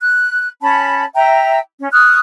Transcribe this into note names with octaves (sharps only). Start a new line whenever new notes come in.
F#6
C#4 A5 B5
E5 G5 A#5
C#4
C#6 D#6 F6 F#6